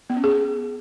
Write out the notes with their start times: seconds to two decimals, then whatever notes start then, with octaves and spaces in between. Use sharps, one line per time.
0.10 B3
0.17 C#4
0.24 G#4